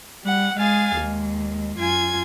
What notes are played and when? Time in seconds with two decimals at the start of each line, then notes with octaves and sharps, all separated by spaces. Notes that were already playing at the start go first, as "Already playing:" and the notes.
0.24 G3 F#5
0.57 G#3 G#4 F5 G#5 A6
0.96 D#2 G#3
1.79 F#2 F4 G#5 G#6